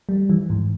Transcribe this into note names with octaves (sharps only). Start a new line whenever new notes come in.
G3
E3
G#2